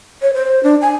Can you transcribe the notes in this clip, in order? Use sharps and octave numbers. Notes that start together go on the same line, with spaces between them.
C#5
C5
D4
G#5